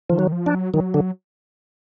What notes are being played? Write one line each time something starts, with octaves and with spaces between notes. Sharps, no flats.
D#3 F3
F#3
F3
D4
F#3
D#3 F#3
D3